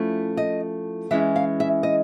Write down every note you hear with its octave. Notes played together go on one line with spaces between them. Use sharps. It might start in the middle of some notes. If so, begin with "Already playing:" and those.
Already playing: F3 A3 C#4 E4
D#5
E3 G#3 C#4 E4 E5
F5
E5
D#5